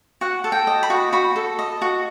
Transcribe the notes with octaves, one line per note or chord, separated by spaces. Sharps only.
F#4 F#5
A4
G5
D#5
B5
F#4
F#4 B5
A4
D#5
F#4